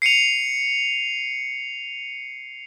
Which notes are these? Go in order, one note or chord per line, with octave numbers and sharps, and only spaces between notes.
C7 C#7 D#7 F7